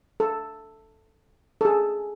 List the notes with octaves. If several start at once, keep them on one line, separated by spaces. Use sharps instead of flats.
A4
A4
G#4